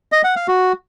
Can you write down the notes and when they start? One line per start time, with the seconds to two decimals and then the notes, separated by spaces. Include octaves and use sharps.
0.12 D#5
0.24 F#5
0.36 F5
0.48 F#4